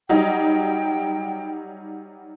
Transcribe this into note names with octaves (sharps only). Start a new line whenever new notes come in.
F#3 G3 D#4 G5